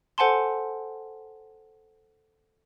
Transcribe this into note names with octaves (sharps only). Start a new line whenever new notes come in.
A4 C5 F#5 G#5 A5 C6